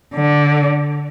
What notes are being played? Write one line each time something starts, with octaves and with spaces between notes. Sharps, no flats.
D3